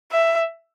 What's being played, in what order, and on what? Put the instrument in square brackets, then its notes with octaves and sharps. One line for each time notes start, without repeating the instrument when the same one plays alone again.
[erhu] E5